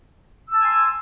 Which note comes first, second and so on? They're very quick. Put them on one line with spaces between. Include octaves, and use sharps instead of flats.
E6 A5 G#5 C6